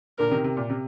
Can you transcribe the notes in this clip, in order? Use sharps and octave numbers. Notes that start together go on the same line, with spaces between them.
A#2 D3 A#4
C3 D#3
C3
A#2
C3